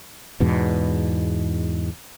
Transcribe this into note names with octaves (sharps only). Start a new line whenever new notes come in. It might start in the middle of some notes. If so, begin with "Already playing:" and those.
E2 G#2 B2